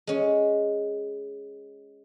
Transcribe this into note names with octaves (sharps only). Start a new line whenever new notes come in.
G#3 C#4